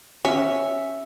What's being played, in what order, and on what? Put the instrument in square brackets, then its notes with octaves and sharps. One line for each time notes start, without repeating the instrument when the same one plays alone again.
[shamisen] C#4 [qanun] E5